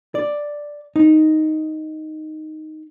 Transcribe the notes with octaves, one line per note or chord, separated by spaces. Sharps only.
D5
D#4